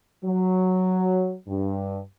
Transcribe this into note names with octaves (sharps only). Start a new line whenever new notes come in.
F#3
G2